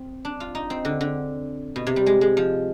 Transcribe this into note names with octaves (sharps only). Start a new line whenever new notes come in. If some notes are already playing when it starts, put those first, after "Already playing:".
Already playing: C4
D4
F4
D#4
C4
D3
D3
B2
C3
G3
G#3
G#3
F3